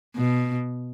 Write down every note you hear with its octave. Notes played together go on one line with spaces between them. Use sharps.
B2